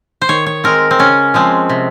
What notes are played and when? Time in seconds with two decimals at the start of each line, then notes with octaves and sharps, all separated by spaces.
0.22 C5
0.29 D#3 C#5
0.46 C#5
0.64 G#3 C4 A#4
0.91 C4
0.99 C#3 C#4
1.34 F3 G#3 C4
1.69 C3